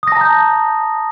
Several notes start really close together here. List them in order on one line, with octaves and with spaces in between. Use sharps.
D#6 A#6 A5 A#5 G6